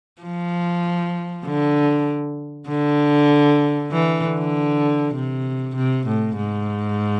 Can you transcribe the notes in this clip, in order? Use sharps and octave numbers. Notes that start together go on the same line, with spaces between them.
F3
D3
D3
E3
D3
C3
C3
A2
G#2